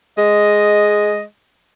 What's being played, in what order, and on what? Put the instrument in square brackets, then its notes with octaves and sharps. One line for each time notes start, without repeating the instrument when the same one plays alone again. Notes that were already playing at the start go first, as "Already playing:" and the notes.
[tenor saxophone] G#3 [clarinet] D#5